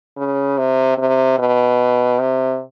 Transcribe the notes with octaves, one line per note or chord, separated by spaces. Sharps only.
C#3
C3
C3
B2
C3